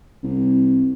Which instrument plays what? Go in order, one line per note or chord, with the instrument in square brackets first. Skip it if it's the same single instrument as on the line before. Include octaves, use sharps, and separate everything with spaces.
[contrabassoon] C2